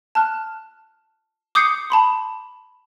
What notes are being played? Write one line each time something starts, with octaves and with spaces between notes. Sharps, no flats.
A5 F6 F#6
D6 D#6 G6 C7 C#7
A5 B5 C6